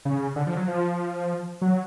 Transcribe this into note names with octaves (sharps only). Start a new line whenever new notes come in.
C#3
D3
F3
F#3
F3
F#3